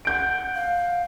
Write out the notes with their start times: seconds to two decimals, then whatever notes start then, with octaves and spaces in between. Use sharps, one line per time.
0.05 F#5 G6 D7
0.55 F5